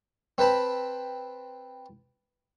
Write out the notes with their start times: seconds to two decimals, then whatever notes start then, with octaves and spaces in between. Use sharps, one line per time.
0.38 C4 B4 G5 A5 B5